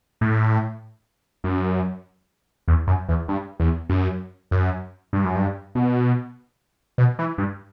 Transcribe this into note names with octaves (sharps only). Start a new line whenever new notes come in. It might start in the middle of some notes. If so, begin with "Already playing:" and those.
A2
F#2
E2
F#2
E2
G2
E2
F#2
F#2
G2
F#2
G2
B2
B2
E3
G2